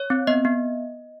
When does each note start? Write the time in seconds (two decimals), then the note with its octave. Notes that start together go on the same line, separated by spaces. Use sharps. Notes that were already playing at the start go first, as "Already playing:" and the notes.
Already playing: C#5
0.10 C4
0.27 B3 D#5
0.45 B3